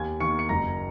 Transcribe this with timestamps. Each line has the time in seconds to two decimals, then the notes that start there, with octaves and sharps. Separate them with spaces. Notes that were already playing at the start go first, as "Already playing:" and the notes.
Already playing: D#2 G#5 G#6
0.20 D#3 A#3 C#6 C#7
0.39 C#7
0.49 F#1 A#5 A#6